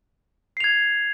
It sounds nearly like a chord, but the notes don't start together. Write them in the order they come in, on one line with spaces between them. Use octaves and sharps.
C7 F7 G#6